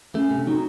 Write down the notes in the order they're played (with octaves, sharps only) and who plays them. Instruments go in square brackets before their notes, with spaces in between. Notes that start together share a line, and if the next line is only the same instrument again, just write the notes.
[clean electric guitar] A3 [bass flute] C#4
[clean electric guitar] C3
[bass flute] C#4
[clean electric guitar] F#3 [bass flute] D#4